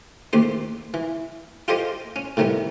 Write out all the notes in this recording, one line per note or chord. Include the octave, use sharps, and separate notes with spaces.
A1 D#2 G4 C5
E3
F4 G4 A4 C5 D#5 G5
C#4
A2 C3 D#3 G3 B3